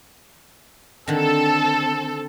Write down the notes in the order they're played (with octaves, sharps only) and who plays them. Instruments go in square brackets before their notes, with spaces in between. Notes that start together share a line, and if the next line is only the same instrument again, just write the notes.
[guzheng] D3 D#3 [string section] C4 A4